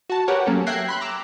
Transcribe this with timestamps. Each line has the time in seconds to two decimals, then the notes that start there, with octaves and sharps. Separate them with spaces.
0.10 F#4 A5
0.28 G4 A#4 B4 C#5 F#5
0.46 F#3 A#3 C#4 A4
0.67 E5 G5 F#6 G#6 A#6 C7
0.89 B5 C6 F#6
1.01 A#5 D6 E6 F#6